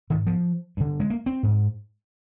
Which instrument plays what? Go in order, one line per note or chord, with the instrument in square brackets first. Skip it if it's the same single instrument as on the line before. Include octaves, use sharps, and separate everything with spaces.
[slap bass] G#2 D#3
F3
G2 D3
G#3
A#3
C4
G#2